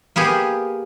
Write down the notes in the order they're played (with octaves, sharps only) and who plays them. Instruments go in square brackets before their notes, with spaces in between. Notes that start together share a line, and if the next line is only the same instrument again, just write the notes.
[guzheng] A#3 B3 G4 G#4